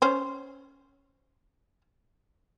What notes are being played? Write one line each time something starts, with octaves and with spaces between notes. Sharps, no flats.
C#4 C5 C#5